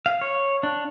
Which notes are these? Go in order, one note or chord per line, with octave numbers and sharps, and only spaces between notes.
F5
C#5
D4